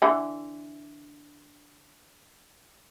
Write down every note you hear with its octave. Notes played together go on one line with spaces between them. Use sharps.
D3 E3